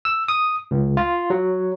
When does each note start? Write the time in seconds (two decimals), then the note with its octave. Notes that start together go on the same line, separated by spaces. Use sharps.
0.05 E6
0.28 D#6
0.71 C#2
0.97 F4
1.30 F#3